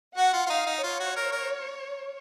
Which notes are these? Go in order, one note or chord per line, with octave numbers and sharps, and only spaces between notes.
F#4 F#5
F4
F4
D#4 F5
D#4
F4 C#5
F#4
A#4
A#4